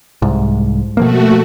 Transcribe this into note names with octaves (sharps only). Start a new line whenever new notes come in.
C2 G#2
B2 F3 A3 A#3 F#4